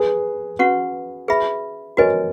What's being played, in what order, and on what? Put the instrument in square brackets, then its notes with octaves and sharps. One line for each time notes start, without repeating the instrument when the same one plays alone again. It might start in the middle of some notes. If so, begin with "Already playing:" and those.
Already playing: [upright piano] G#4 B4
[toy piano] C#4 F#4 B4 F#5 C#6
G#4 B4 E5 B5
[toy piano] F#4 B4 D#5 G#5 [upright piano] A#4 C#5